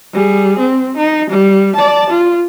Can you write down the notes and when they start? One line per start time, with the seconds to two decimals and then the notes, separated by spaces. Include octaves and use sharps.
0.13 G3 G#4
0.59 C4
0.97 D#4
1.30 G3
1.76 D5 A5
2.10 F4